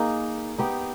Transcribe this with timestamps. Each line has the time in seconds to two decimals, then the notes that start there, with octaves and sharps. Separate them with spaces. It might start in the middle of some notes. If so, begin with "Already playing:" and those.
Already playing: A#3 D#4 G#4
0.58 B3 D#4 G4